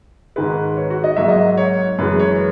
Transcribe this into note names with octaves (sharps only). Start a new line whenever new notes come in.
G#2 D#3 G#3 B4
C#5
F#4
D#5
G#2 F#3 A#3 E5
D#5
C#5
F#2 E3 G#3 B4
C#5